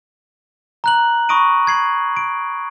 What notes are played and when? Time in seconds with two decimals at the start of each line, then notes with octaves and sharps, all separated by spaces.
0.84 A#5 F#6 F#7
1.29 B5 C#6 D#6 A#6 D7 D#7
1.67 G#6 C7 F#7
2.17 D7